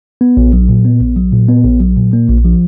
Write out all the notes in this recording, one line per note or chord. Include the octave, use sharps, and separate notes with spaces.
B3
A#1
F#3
A#2
B3
A#1
F#3
A#2
B3
A#1
F#3
A#2
A#3
A#1
F3